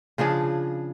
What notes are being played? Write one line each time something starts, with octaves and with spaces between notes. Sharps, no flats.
C#3 F3 D4 G#4